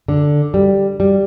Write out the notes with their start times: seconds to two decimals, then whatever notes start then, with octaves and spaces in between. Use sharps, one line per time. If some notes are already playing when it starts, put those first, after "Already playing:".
0.08 D3
0.54 G3
1.00 G3